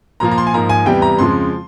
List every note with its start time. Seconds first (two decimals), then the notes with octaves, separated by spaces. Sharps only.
0.20 A#2 F3 A#3 A#5
0.31 A#5
0.38 C6
0.47 G#5
0.54 G#2 F3 A#3 A#5
0.69 G#5
0.86 E2 C3 E3 G3 G5
1.02 A#5
1.19 F2 C#3 F3 G#3 C6